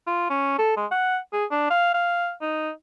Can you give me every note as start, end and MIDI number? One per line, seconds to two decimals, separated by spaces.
0.07 0.28 65
0.30 0.54 61
0.58 0.72 69
0.77 0.86 56
0.91 1.18 78
1.33 1.45 68
1.51 1.66 62
1.70 1.91 77
1.94 2.32 77
2.41 2.70 63